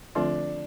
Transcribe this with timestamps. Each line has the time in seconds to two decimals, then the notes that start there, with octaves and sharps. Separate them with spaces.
0.15 D3 F3 A3 C4 D4 F4